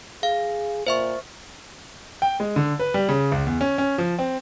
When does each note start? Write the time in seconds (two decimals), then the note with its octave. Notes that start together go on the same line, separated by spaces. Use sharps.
0.23 G#4 F5
0.87 A#2 C5 E5 C#6
2.22 G5
2.40 G#3
2.56 D3
2.79 B4
2.94 G3
3.09 C#3
3.32 C#2
3.46 E2
3.61 C#4
3.78 C#4
3.98 F3
4.19 C4